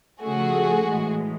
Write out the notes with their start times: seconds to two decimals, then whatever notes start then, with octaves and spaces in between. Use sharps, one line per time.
0.22 C#3 F3 A3 F#4 G#4
0.87 A2 E3 G#3